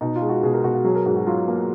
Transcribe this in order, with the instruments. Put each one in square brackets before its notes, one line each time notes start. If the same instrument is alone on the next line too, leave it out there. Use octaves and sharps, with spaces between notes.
[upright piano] B2 D#4
F4
G#3
F#4
B2 G#4
A#4
B2 F#4
F#4
F#3 G#4
A#4
G#2 F#4
F#4
F#3 F4
A#3